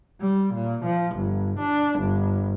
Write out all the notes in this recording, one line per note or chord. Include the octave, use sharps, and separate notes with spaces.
G3
A#2
F3
G1
D4
G1